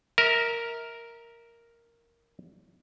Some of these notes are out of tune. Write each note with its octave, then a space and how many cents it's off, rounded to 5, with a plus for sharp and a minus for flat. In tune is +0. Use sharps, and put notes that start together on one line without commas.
A#4 +0 E5 -30